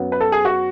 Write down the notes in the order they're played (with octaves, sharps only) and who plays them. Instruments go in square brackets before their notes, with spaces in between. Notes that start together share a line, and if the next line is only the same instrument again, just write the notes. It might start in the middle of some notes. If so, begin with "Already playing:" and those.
Already playing: [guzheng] F#2 F#3 B3
[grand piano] B4
A4
G#4
F#4